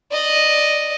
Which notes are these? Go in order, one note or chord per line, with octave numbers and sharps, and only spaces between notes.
D5 D#5